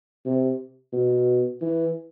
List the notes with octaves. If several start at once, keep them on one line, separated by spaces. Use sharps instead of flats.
C3
B2
E3